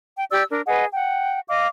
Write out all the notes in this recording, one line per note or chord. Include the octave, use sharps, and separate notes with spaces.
G5
G4 D5 E6
D4 A#4
G#4 B4 D#5 F#5
F#5 G5
D#5 F5 D6